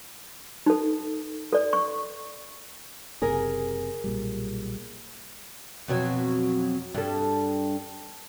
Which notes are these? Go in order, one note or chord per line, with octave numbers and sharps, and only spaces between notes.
D#4 A4
A4 D5
C#6
F#1 C3 G#4 A#4
B1 A#2 G3
F2 B2 F#3
G2 A4